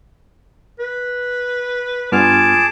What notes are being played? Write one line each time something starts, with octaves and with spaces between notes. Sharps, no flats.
B4
G2 B3 F4 G#4 A5 D6 F6